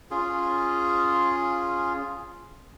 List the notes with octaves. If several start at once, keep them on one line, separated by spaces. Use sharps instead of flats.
C#4 F4 G#4